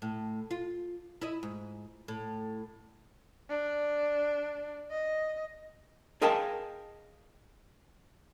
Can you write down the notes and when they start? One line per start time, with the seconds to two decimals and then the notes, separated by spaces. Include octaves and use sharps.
0.02 A2
0.51 F4
1.21 E4 D#5
1.43 G#2
2.08 A2
3.49 D4
4.91 D#5
6.21 G#4 A#4 D#5 F5 G5 A5